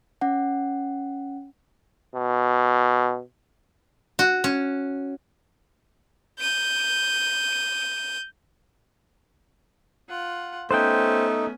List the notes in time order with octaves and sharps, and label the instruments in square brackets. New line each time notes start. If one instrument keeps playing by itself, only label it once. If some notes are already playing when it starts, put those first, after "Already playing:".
[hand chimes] C#4 F#5
[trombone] B2
[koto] F#4
C#4
[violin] G6 D#7
[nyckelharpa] F4 F#5
[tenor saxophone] A3 [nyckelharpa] B3 C#4 [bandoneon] D#4 [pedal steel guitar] C5 F#5 G5